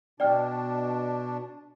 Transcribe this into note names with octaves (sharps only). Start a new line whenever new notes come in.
B2 D4 D5 G5 F6